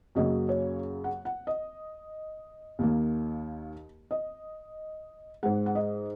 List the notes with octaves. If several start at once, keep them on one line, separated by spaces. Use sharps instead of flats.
F#2 C#3 F#3 A#3 D#5
C#5
F#5
F#5
D#5
D#2 D#3 A#3
D#5
G#2 G#3 F#5
F#5
D#5